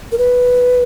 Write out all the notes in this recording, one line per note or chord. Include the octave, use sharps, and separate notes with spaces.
A#4
B4